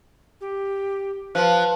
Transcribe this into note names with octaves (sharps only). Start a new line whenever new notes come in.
G4
F3 B4 A5 F#6